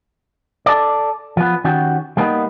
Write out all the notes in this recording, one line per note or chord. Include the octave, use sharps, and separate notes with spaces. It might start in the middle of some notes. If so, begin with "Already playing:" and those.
A4 D5
F3 B3
D#3 C#4 F#4 G4
G3 A#3 B3 C#4 D#4